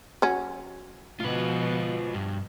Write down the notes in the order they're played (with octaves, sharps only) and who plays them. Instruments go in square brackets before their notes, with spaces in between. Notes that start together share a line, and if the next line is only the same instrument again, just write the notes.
[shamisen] F#3 C#4
[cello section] B2 F3 [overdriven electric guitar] F4 B4
[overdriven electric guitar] G2